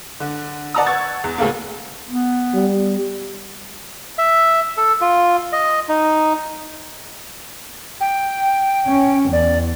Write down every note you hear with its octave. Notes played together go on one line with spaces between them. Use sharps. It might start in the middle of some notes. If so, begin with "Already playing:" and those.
D3
D5 F#5 A5 A#5 D#6
F#5 C#6 E6 G#6 A6
E2
D2 A2 C#3 A3 A#3
B3
G3
E5
A4
F4
D#5
D#4
G5
C#4
E2 D5